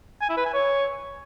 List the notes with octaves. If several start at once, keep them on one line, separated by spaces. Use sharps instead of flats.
G#5
E4
B4
G#5
C#5